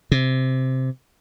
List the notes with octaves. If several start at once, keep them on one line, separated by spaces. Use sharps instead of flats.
C3